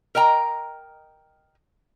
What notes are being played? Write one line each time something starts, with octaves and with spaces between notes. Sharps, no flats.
A#4 D#5 G5 A#5